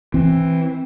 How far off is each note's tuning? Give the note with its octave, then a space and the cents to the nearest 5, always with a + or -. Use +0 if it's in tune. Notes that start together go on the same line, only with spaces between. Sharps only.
E3 +0 C4 +10